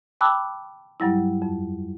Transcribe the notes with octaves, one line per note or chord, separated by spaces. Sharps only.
G5 A5 B5 D6 E6 F#6
G2 F#3 G3 E4
F2